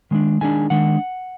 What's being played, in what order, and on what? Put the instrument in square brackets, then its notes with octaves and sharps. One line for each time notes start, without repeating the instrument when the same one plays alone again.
[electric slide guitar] D#3 G#3 D4
D#3 G#3 D4 G#5
D#3 G#3 D4 F#5